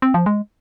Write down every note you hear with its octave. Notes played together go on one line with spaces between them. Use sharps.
C4
F3
G#3